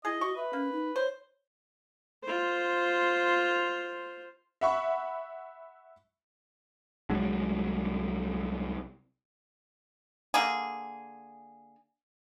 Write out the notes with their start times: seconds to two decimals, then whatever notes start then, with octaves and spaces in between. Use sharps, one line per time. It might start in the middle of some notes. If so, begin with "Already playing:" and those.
0.05 E4 G#4 D#5
0.21 F#4 C#6
0.36 B4 E5
0.53 A#3 C#4
0.72 D#4
0.96 C5 C#5
2.23 F4 C5
4.61 E5 F#5 B5 C#6
7.10 C2 F#3 G#3 D4
10.34 D3 A#3 G#4